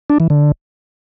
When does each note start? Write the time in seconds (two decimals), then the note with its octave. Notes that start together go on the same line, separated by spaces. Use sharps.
0.10 D4
0.20 E3
0.30 D3